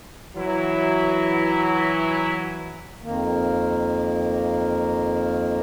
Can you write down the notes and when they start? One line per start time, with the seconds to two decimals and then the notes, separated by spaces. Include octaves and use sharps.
0.37 E3 F#3 E4
3.03 F2 D#3 A#3